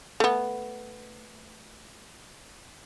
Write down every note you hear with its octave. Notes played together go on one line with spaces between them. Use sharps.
A3 B3